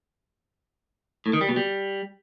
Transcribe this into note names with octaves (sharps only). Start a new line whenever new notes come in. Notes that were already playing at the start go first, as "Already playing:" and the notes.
A2
D#3
G3
B2
G3